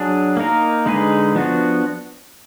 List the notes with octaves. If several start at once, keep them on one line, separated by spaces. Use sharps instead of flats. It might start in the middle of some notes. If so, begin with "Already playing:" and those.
Already playing: F#3 D4 G#4
A#3 D#4 A#4
D3 G#3 D#4 G#4 B4
F3 B3 D4 F#4